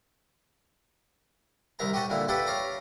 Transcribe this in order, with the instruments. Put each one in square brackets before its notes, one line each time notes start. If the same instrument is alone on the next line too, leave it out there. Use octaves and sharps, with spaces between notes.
[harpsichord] C2 D#3 E4 A#5
G4 C#5 D#5 F#5 A5
A#2 D3 E4
E4 G4 A4 B4 D5 F#5
C#5 D5 F5 A#5